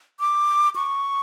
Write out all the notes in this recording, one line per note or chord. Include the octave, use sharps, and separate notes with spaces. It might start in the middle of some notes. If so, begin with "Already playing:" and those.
D6
C#6